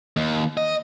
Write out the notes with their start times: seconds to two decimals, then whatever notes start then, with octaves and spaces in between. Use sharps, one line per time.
0.16 D#2
0.57 D#5